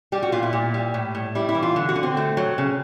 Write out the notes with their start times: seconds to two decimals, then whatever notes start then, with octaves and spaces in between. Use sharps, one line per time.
0.12 G3 G4
0.23 F#4
0.32 A#2 F4
0.43 E4
0.53 A#2
0.74 G3
0.94 A2
1.15 A2
1.35 G3 E4
1.49 E4
1.55 E3
1.63 F4
1.76 D3
1.89 F#4
1.96 D3
2.03 C4
2.17 A3
2.37 F#3
2.58 C#3